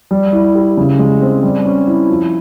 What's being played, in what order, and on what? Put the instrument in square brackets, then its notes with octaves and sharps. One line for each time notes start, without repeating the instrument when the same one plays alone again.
[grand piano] G3
E4
G4
C#3
G#3
C4
G3
C#4
E4
F3